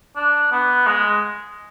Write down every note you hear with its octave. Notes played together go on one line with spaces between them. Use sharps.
D4
B3
G#3